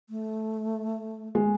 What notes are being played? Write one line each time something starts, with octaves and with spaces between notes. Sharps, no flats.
A3
G#3